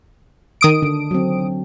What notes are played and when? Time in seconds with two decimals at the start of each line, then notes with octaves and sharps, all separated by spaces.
0.61 D#3 D#6 D7
0.82 D3 D4
1.11 F#3 C4